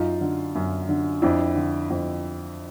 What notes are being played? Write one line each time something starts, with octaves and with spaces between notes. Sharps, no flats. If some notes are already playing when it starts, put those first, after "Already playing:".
Already playing: F#2 D#4 F4
D3
F#2
D3
F2 D4 E4
D3
F2